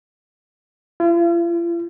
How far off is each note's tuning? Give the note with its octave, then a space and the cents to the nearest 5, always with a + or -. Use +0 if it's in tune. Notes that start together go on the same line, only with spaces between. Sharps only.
F4 -45